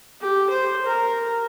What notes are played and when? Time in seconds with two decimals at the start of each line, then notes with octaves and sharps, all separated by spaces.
0.21 G4
0.50 C5
0.86 A#4